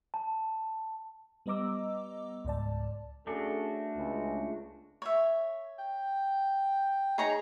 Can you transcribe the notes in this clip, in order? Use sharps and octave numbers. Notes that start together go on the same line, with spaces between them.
A5
G3 B3 D#5 A#5 D6 E6
C#2 G#2 D5 A5
A3 C#4 D4 F#4 G#4 A4
C#2
C#5 E5
G5
D#4 G#4 C#5 A#5